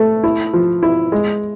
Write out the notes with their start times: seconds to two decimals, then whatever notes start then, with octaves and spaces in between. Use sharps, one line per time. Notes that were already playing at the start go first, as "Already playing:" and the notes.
Already playing: A3
0.23 E4
0.53 F3
0.83 E4
1.12 G#3